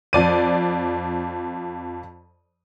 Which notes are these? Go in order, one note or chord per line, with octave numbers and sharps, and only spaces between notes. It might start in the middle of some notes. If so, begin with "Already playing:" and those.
F2 D5 D#7